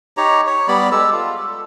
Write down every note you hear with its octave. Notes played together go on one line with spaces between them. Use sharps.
D#4 G4 C#5 A#5
C#5
G3 B3 D5 B5
G#3 G4 A4 E6
F4
A4